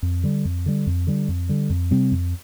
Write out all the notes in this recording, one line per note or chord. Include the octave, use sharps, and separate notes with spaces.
F2
D3 G3
F2
D3 G3
F2
D3 G3
F2
D3 G3
F2
C3 G3 C4
F2